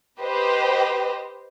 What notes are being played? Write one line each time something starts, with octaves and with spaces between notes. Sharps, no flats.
G4 B4 C5 D#5